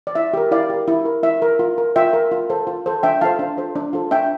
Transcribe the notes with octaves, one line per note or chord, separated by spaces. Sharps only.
D5
E4 E5
G4 A#4
E4 D5 F5
G4 A#4
E4
A#4
E4 E5
A#4
F4
A#4
F4 E5 G5
A#4
F4
A4 C5
F4
A4 C5
D4 E5 G5
F4 A4 C5 F5 A5
D4
F4 A4 C5
D4
F4 A4 C5
D4 E5 G5